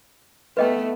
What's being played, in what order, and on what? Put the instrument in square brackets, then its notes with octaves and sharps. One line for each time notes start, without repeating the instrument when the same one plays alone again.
[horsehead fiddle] A3 B3 [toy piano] B4 D#5 G5